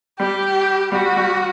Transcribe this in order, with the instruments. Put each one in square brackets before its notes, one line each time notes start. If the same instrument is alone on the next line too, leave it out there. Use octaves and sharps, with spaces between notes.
[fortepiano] G3 [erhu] G4
[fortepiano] G3 [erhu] F#4
[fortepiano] G3